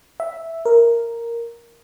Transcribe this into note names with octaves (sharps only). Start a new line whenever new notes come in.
E5
A#4